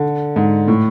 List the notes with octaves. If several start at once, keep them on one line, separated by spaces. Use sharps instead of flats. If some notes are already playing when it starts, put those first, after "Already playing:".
Already playing: D3
G#2
A2